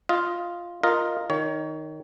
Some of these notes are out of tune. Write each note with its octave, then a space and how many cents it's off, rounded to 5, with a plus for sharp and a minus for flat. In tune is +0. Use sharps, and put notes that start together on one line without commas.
F4 +0 D#5 +20
F4 +0 A#4 +0 D#5 +0
D#3 +0 C#5 +30